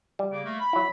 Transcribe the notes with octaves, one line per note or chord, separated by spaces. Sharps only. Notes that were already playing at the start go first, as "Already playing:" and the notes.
G3
C#3 A#3 D6
A3 A#3
B5
F#3 E4